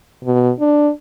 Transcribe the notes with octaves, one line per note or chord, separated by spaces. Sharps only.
B2
D4